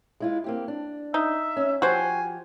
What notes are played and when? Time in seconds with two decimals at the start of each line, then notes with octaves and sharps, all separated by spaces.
0.20 G#3 E4 F4
0.44 A#3 C4 G4
0.68 D4
1.14 D#4 E5
1.56 C#4
1.82 F3 F#4 G4 C5 G#5